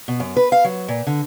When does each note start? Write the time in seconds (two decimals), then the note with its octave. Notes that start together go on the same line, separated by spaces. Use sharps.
0.08 B2
0.20 F#2
0.37 B4
0.52 F5
0.65 F#3
0.88 A#2
1.07 D3